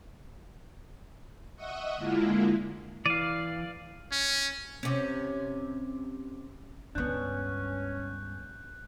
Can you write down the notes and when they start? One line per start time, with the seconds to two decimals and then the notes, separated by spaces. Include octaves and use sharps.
1.56 D#5 E5 F#5 C#6 D#6
1.97 D3 G#3 A#3 E4 F4
3.06 E3 D5 F5 D#7
4.12 C#4
4.83 C3 C#4
6.95 C#2 G2 B3 C#4 D4 F#6 G6